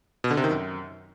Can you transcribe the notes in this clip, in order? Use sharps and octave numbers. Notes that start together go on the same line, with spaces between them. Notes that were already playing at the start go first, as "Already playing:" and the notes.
B2
D3
C3
D#3
F#2